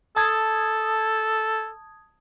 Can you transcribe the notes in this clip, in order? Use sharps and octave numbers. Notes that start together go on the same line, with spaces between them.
A4 A5 D#6 G#6